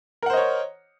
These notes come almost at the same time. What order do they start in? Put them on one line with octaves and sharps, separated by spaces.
A#4 F#5 C5 D#5 C#5